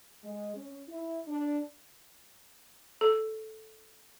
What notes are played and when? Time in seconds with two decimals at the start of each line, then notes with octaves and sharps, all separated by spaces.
0.23 G#3
0.56 C#4
0.89 E4
1.27 D4
3.01 A4